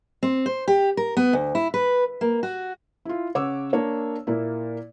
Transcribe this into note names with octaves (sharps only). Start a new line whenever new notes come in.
C4
C5
G4
A#4
B3
D2
E4
B4
A#3
F#4
E4 F4
C#3 C#5 F#5 D6 E6
A#3 D4 C#5
A#2 A#3 E4